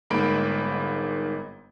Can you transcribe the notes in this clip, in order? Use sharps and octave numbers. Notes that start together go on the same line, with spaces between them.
G1 G#2 A#3 B5 D7